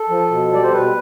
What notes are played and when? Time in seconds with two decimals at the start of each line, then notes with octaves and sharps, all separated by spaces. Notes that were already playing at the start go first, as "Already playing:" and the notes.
Already playing: A4
0.09 F3
0.31 B2
0.53 G3 D5
0.63 C5
0.73 B2 B4